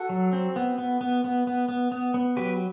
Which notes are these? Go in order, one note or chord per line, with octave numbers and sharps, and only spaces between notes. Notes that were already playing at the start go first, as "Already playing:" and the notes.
Already playing: F#4 A4
F#3
C4
B3
B3
B3
B3
B3
B3
B3
B3
F#3 G4 B4